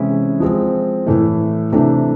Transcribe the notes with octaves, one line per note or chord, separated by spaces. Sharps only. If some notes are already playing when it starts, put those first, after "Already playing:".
Already playing: C3 E3 G#3 C#4 E4
F3 G#3 C4
A2 E3 A3
C3 E3 A3 D4